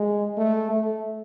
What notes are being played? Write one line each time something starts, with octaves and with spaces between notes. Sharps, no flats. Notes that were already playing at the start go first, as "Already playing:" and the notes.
Already playing: G#3
A3
A3